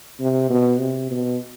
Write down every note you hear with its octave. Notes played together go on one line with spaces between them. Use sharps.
C3
B2
C3
B2